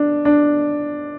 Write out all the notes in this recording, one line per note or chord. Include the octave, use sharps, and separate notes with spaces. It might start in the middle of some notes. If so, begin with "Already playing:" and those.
Already playing: D4
D4